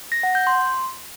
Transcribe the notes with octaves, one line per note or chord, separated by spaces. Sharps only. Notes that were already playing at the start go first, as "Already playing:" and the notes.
A#6
F#5
G6
C6